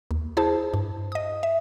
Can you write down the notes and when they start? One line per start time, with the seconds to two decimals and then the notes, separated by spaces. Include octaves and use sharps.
0.11 D#2
0.37 E4 G#4 C5 A5
0.74 G2
1.12 D#5 D#6
1.43 E5